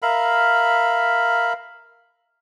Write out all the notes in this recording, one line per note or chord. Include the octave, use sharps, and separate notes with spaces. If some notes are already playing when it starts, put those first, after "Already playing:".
A#4 E5 F5 B5